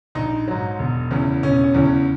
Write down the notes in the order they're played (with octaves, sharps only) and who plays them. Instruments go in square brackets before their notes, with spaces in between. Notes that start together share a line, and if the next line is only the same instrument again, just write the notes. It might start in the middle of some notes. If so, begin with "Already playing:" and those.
[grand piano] A#1 D#4
G#2 F#3
E1
E2 C#3 E3
E1 C#4
C#4
E2 C#3 E3
C#4